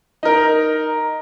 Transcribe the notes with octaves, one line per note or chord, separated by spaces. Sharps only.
D#4 A#4